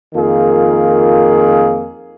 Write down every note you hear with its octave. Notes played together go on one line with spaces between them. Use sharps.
F2 D#3 A#3 F4 G#4